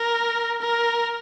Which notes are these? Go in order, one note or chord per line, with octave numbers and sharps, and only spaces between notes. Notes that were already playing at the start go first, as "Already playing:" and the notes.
Already playing: A#4
A#4